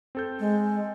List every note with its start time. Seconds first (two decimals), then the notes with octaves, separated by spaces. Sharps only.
0.15 C4 A4 G6
0.40 G#3